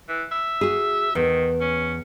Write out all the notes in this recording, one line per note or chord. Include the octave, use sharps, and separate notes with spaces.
E3
E5
F#4 G#4
E2 D#3
C#4